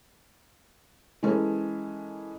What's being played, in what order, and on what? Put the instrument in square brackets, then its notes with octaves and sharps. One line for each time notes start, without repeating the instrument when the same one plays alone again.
[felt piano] E3 G#3 C#4 A4 A#4